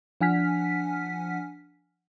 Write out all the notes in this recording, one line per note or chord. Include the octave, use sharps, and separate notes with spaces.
F3 D4 F#5 G#5 F6 B6